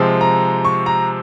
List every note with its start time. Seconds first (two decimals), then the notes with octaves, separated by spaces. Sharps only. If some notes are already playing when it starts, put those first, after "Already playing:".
Already playing: C3 F3 G#3 C4
0.21 A#5
0.65 C#6
0.86 A#5